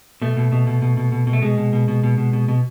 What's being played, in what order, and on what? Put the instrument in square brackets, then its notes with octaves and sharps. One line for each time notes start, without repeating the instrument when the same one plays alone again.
[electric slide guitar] B2 A3
B2
B2
B2
B2
B2
B2
B2
A3
B2 G#3
B2
B2
B2
B2
B2
B2
B2